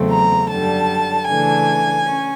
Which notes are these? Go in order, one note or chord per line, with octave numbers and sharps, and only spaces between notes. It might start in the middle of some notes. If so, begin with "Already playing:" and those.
Already playing: E2 C#3 F#3 A3 C4
A#5
F#2 D3 G3 A5
C#3 E3 A3 D4 G#5
C#4